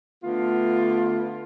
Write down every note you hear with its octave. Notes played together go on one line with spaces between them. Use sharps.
D3 A3 B3 F4